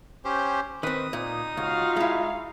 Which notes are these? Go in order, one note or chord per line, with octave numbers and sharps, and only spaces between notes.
C#4 G4 C5
D#3 C4 B4 D#6
A#2 D#4
C#2 F4 F#4 F5
G#3 E4